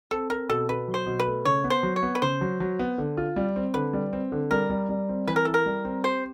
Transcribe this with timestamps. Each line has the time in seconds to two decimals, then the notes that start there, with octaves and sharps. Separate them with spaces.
0.11 C4 A4
0.30 C4 A#4
0.49 B2 A4
0.69 B2 B4
0.88 F#3
0.94 C5
1.06 B2
1.19 B4
1.25 A3
1.45 C#3 C#5
1.64 B3
1.70 C5
1.83 F#3
1.96 C#5
2.03 B3
2.15 B4
2.22 C#3 C5
2.41 F#3
2.60 F#3
2.79 B3
2.98 D3
3.17 F4
3.36 G3
3.56 C4
3.74 D3 B4
3.93 G3
4.13 C4
4.32 D3
4.51 G3 A#4
4.70 G3
4.89 G3
5.09 C4
5.27 E3 B4
5.36 A#4
5.45 E4 A4
5.54 A#4
5.66 G3
5.85 C4
6.04 G4 C5